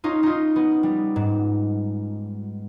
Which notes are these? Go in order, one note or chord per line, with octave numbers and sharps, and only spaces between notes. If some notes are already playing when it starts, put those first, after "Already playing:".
C#4 D#4 F4
D#4 F4
B3
G3
G#2